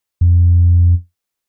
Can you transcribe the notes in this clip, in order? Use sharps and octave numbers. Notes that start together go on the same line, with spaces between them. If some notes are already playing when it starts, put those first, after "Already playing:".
F2